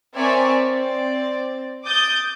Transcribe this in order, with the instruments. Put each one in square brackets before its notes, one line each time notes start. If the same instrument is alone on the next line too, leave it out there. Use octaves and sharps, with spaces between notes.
[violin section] C4 A#4 C#5 D5 E5 G#5
C4 D5
D6 D#6 G6 A6